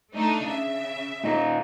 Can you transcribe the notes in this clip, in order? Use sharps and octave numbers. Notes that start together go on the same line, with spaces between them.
A3 D4 D#4
C#3 E5
A#2 D#4